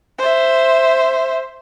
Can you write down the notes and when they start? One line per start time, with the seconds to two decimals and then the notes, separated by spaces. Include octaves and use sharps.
0.18 C5 E5